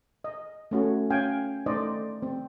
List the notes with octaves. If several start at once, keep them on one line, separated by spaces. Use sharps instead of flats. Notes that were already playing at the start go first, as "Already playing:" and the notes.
D#5
A3 C#4 F#4
C#4 F5 G5 G#5
A3 D#4 C5 D5 D#5
C4